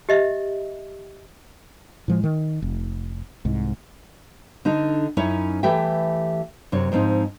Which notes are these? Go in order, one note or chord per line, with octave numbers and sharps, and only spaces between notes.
G4 D#5 E5
A2 F3 G#3
D#3
F1
C2 G#2
D3 D#4 A4
F#2 C#4 D#4 E4 C#5
E3 A3 G4 E5 G5
F#2 C3 C#5
G#2 F3 B3 C4 D#4